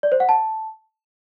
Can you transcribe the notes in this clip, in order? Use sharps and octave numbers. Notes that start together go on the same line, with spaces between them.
D5
C5
F#5
A5